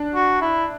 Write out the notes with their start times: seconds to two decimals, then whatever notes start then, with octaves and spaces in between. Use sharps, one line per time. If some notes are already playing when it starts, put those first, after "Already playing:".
Already playing: D4
0.15 F#4
0.41 E4